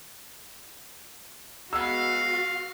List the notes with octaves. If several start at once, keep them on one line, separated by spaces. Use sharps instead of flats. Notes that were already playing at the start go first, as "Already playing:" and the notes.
G#3 B3 F#4 F5 E6